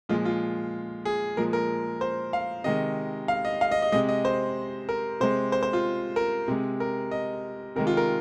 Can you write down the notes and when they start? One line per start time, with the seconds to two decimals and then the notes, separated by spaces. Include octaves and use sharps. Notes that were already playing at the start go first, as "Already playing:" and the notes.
0.09 A#2 F3 G#3 F4
0.25 F4
1.05 G#4
1.37 A#2 F3 G#3 A#4
1.53 A#4
2.01 C5
2.33 F5
2.64 C3 D#3 G#3 D#5
3.28 F5
3.45 D#5
3.61 F5
3.72 D#5
3.82 D#5
3.92 C3 G#3 D#5
4.09 D#5
4.25 C5
4.89 A#4
5.20 C3 G#3 C5
5.52 C5
5.63 C5
5.73 F4
6.16 A#4
6.48 C3 G#3
6.80 A#4
7.11 D#5
7.76 C3 D#3 G#3 A#4
7.87 F4
7.97 A#4